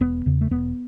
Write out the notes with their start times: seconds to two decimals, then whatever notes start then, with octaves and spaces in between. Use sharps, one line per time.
0.01 E1 B3
0.26 E2 C#3
0.41 A3
0.51 E1 B3